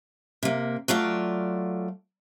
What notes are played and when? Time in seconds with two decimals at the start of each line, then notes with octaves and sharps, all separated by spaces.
0.43 C3 A#3
0.88 F#3 A3 F4 D5